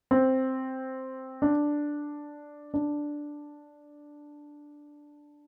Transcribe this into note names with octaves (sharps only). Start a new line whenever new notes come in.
C4
D4
D4